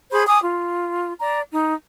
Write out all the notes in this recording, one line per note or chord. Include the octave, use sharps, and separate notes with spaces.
G#4 C5 B5
G#5 D6 D#6
F4
D5 A#5
D#4